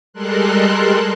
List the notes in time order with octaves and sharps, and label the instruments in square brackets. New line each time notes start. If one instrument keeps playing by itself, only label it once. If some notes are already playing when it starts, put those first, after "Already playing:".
[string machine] G3 G#3 A4 A#4 C6 F#6